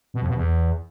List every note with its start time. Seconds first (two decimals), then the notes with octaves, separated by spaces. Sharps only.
0.14 B2
0.21 F2
0.29 B2
0.36 E2